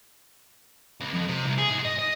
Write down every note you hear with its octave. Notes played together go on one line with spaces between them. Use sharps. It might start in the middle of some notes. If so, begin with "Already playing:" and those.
C#2
F2
C3
C2
G#4
G#2
D#5
D#5